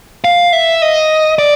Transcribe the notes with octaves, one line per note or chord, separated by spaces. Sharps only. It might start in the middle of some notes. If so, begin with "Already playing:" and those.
F5
E5
D#5
D5